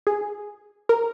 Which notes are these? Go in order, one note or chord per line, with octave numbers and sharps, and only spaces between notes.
G#4
A#4